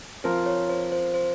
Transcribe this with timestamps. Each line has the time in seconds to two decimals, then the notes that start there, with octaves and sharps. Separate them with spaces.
0.24 F3 C4 F4 A#4 C5
0.46 C#5
0.69 C5
0.92 C5
1.14 C5